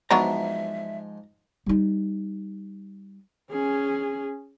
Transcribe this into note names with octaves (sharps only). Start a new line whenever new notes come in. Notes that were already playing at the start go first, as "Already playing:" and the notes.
G#2 F3 F#3 B3 D4 E5 A#5
G3 D#4
C#4 G#4